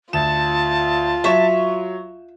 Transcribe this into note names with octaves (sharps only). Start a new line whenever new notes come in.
D2 F4 A5 E7
F#3 E5 C#6 E7